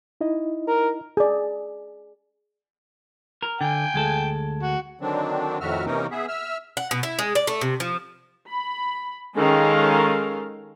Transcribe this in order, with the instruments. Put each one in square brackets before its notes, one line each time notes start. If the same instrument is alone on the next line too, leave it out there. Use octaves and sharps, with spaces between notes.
[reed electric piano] D#4 E4 D#5
[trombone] A#4
[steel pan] G#4 D5
[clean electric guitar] A#4
[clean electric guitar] D3 [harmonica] G5 G#5
[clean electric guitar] D2 G#3 A4
[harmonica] F#4
[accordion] D3 D#3 F#3 C4 D4
F2 A2 D#3 F#4 E5 F6
C3 E3 A#3 C#4 D#4 A#4
B3 G#4 E5
E5 E6 F6
[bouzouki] F#5
B2
E4
G#3
D5
A3
C3
F3
[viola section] B5
D#3 G#3 C#4 A4 A#4 F5